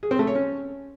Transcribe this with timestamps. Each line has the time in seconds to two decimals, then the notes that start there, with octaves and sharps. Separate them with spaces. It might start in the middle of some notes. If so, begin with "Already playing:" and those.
0.03 G#4
0.11 C4
0.19 A3
0.27 C#5
0.35 C#4